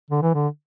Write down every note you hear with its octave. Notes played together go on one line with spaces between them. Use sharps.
D3
E3
D3